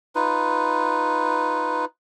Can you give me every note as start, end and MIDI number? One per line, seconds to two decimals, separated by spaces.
0.15 1.85 63
0.15 1.85 65
0.15 1.85 71